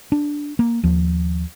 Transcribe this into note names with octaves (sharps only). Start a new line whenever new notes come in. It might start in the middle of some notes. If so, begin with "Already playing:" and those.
D4
A#3
D#2 F3